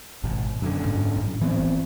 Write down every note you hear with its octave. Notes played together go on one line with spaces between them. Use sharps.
G#1 B2
F#2 D3
G#2
A1 C#4
E3 B3 C4
G1